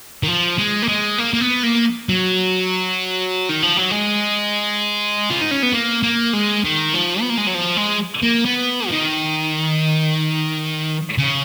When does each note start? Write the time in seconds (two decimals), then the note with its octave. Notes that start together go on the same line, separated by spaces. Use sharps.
0.23 D#3
0.28 F3
0.58 G#3
0.82 A#3
0.88 G#3
1.18 A#3
1.34 A#3
1.41 B3
1.63 A#3
2.09 F#3
3.49 D#3
3.63 F3
3.77 F#3
3.91 G#3
5.30 F4
5.41 D#4
5.51 C#4
5.63 B3
5.73 A#3
6.03 A#3
6.33 G#3
6.64 D#3
6.94 F3
7.21 B3
7.29 A#3
7.37 G#3
7.47 F#3
7.54 F3
7.77 G#3
8.23 A#3
8.46 B3
8.87 F3
8.91 D#3
11.18 C#3